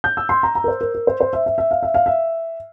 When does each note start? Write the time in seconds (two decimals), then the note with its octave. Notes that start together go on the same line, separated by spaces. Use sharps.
0.04 G6
0.17 E6
0.29 C6
0.43 A#5
0.55 A#5
0.64 A#4
0.68 C5
0.81 A#4
0.95 A#4
1.07 C5
1.21 C5
1.33 E5
1.46 E5
1.58 E5
1.71 F5
1.83 E5
1.94 F5
2.06 E5